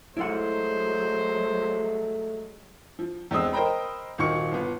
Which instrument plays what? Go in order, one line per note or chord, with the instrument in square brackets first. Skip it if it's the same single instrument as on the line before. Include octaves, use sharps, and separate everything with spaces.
[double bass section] F#3 G#3 [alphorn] A3 [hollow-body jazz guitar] E4 F4 F#5 [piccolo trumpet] C5
[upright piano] F3
E2 G#3 C4 D#6 E6
A#4 C5 D#5 G5 A#5 B5
D#1 D#3 F#4 C#6 C#7
G1 B3